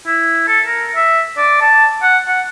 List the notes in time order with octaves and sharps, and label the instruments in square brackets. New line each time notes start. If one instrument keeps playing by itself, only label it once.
[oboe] E4
A4
A#4
E5
D5
A5
F#5
F#5